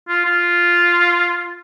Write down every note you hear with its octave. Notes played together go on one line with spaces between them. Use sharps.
F4
F4